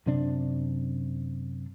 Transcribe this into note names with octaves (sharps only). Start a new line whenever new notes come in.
F#2 C3 D4